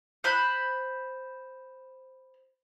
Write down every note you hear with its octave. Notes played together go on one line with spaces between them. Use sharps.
C5 B5 F#6